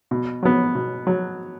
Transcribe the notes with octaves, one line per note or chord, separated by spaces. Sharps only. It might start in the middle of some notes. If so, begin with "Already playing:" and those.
B2
F#3 B3
B2
F#3